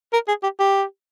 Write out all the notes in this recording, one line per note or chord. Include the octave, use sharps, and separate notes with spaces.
A#4
G#4
G4
G4